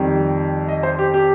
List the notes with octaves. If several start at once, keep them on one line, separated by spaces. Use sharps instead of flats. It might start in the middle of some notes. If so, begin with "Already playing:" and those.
Already playing: F2 D#3 G3
D#5
C5
G4
G4